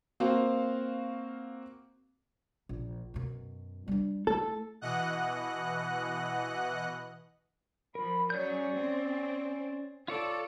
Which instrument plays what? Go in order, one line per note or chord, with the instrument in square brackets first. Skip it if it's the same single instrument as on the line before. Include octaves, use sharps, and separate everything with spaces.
[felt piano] A#3 C4 F#4 F5
[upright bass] A#1
F#2 B2
G3 D4
[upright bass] A3 E4 [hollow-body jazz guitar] A4
[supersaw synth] B2 E3 D#5 F#5 F#6
[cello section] F3 [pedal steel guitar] A#4 [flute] B5
[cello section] F#3 C#5 [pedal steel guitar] C#4 G#4 G6 [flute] D5
[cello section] C4
[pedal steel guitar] F4 C#5 D5 [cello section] A4